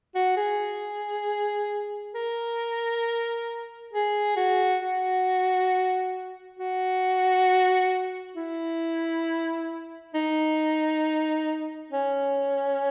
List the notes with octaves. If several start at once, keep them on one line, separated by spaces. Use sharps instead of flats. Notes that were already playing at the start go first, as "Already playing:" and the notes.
F#4
G#4
A#4
G#4
F#4
F#4
F#4
E4
D#4
C#4